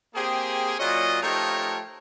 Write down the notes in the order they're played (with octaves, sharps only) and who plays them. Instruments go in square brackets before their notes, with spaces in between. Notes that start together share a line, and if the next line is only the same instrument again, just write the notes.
[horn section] A#3 C4 G4 G#4
A#2 F#3 C#4 F4 D#5
F3 A3 D#4 G4 A#4 C#5